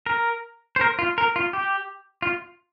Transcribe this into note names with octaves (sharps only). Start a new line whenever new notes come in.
A#4
C5
A#4
F4
A#4
F4
G4
F4